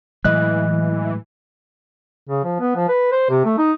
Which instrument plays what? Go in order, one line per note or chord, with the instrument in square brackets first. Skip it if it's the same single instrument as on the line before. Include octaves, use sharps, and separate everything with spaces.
[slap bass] A2 F#3 G#3 [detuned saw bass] E3 [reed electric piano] D#5 F#6
[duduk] C#3
F3
B3
F3
B4
C5
C3
A3
D#4